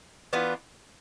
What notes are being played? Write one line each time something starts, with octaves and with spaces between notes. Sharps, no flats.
E3 B3 D4 F4